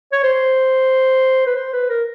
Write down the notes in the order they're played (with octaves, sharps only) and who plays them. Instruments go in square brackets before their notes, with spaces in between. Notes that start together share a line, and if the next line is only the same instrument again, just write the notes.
[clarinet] C#5
C5
B4
C5
B4
A#4